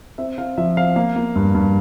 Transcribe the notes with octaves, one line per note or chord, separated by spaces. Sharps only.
C4 E5
C4 F5
F3 E5
C4 F5
A#3 F5
A#3
G2
G2